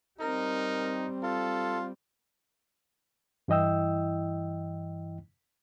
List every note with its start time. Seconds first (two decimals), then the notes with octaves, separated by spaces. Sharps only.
0.20 G3 C4 D#4 A#4
1.23 F4 A4
3.48 G2 E3 E4 D#5 G5 E6